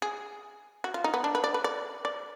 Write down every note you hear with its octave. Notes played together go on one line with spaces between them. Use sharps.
G#4
F#4
F4
D#4
B3
D4
B4
D5
B4
D5
D5